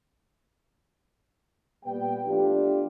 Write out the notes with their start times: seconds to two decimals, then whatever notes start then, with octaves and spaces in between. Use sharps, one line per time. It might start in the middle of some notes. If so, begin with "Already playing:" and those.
1.84 A#2 G3 B3 B4 G5
2.25 F3 A3 B3 D4 F4 G4